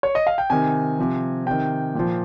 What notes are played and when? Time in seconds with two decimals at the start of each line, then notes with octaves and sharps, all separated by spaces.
0.03 C#5
0.15 D#5
0.27 F5
0.38 G5
0.50 C3 D#3 G#5
0.99 C3 F3
1.46 C3 D#3 G5
1.95 A#2 F3